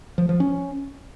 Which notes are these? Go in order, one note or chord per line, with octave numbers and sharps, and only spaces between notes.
F3
F3
C#4